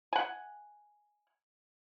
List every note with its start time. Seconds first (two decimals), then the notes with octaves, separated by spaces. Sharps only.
0.13 F#5 G#5